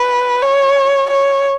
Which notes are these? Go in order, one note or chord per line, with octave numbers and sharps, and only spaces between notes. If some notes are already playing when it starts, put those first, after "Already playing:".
Already playing: B4
C#5
C#5